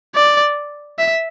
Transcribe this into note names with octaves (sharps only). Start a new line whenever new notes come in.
D5
E5